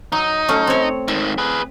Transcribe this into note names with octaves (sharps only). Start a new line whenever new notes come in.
F#3 D#4
F#3 A3 C#4
C4 C#5
G#2 D#3 E5
G#4 B4